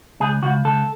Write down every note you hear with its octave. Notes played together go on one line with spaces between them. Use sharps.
C#2 G#4
C#2 F#4
C#2 A4